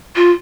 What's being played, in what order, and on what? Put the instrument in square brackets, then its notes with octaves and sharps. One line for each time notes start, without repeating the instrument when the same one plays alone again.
[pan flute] F4